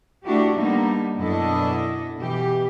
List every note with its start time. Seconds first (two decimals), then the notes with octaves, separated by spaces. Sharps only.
0.24 A3 D4 E4 F#4 G4
0.56 D3 G3 A#3 B3 D#4
1.16 F#2 B2 D4 E4 A4 D#5
2.17 B2 E3 G4